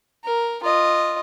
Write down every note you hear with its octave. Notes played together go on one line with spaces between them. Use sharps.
A#4
F4 D#5